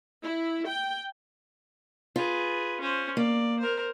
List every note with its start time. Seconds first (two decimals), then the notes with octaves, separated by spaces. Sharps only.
0.24 E4
0.69 G5
2.16 F4 G#4 B4
2.81 C#4 C5
3.17 A#3 D5
3.59 A#4 C5